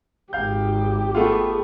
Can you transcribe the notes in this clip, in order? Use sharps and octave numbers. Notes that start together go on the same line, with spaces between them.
G#1 G4 F5 G6
A3 B3 F4 G#4